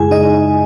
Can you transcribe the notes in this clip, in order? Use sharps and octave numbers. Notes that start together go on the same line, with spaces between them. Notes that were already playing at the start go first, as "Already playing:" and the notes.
Already playing: F#2 C#3 G#3 E4 G#4 G#5
D#4 D#5